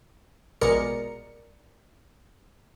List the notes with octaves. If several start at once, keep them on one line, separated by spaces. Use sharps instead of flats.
A#1 B2 G#3 A#4 D5 C#7